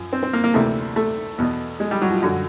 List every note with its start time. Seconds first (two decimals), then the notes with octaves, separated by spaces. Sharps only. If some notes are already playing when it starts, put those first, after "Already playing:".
Already playing: F#2 F3
0.13 C4
0.23 C4
0.33 A#3
0.44 A#3
0.54 D2 C3 E3 A3
0.96 A3
1.38 E2 B2
1.80 G#3
1.91 G3
2.02 F#3
2.11 F3
2.22 F#2 D3 F3 F#3